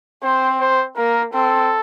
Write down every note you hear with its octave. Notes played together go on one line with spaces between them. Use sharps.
C4 C5
C5
A#3 A#4
C4 A4